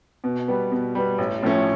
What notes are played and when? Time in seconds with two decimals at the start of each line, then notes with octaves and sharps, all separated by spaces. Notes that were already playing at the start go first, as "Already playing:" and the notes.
0.24 B2
0.48 G3 B3
0.72 B2
0.95 G3 B3
1.18 A1
1.43 A2 F3 A3 C#4